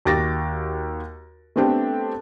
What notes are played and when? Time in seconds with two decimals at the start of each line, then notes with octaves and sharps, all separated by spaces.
0.05 D#2 F#4 G4 D6 A6 A#6
1.56 A3 B3 C4 D4 G4 A4